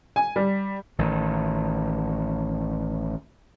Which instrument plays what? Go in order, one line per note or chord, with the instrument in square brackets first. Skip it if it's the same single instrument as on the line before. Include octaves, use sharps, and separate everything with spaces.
[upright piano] G#5
G3
[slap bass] A1 D#3